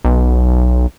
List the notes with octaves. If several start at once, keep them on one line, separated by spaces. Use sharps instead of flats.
B1